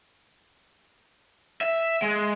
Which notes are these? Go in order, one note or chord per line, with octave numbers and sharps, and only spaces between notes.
E5
G#3